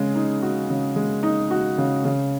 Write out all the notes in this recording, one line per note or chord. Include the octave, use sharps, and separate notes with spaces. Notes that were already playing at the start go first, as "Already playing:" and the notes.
Already playing: C#3 G#3
D#4
F#4
C#3
G#3
D#4
F#4
C#3
C#3